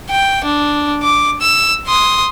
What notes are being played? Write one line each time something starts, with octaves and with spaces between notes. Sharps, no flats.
G5
D4
D6
E6
C6 D#6